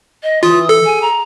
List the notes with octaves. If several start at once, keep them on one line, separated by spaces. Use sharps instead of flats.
D#5
E3 F4 D#6
A4
G#4 G#5
A#5